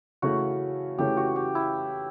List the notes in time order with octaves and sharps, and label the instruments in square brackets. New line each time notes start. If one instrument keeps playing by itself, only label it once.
[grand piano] C#3 E3 A3 C#4 [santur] F#4
[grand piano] C#3 E3 A3 C#4 [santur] G4
[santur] F#4
G4
E4